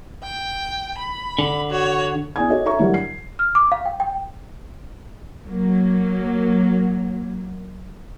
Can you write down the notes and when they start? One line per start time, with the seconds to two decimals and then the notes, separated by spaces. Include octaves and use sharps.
0.24 G5
0.98 B5
1.39 D3
1.71 F#4 C#5
2.36 B2 D4 E4 G#5 D#6 G#6
2.50 D4 F#4 A4 C#5 D#5
2.65 A4 C#5 E5 A#5 C#6
2.79 D3 F#3 G3 E4 G4 A#4
2.94 C7
3.39 F6
3.55 D6
3.72 F5
3.86 G5
4.00 G5
5.48 F#3 A#3